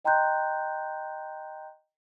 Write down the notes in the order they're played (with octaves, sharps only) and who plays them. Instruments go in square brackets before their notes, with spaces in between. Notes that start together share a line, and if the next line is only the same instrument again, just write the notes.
[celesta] D#5 G5 A#5 C6 F#6 G6